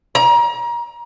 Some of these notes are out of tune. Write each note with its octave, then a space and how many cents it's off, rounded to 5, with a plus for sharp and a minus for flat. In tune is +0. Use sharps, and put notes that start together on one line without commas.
A#5 +30